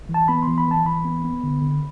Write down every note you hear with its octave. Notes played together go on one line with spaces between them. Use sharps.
E3
A5
B3 B5
E3 C6
B5
E3 A5
E3 B5
B3
B3
D3
D3